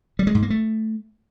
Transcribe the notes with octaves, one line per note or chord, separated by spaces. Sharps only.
G3
G#3
G#2
A#3
A3